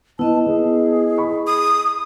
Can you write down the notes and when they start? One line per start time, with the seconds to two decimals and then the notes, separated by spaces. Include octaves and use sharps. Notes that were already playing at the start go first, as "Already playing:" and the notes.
0.19 B3 E4 D#5 A5
0.46 B3 G#4
1.18 B5 C#6
1.47 D#6